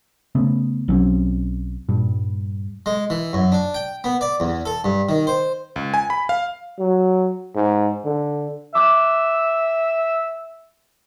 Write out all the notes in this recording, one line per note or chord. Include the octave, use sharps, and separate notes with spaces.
C#3 A3 B3
B1 F#3 C4 C#4
G2 A#2 G3
G#3
E3
F#2
D4
G5
B3
D5
E2
A4
G2
D#3
C5
C#2
G#5
B5
F5
F#3
G#2
D3
E5 D6 E6 F#6